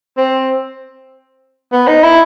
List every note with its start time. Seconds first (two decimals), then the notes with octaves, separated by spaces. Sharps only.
0.18 C4
1.72 B3
1.88 D#4
2.04 E4